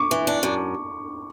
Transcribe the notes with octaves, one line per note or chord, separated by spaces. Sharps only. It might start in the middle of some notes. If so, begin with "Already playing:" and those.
Already playing: C#6 D6
E3
D4
F#2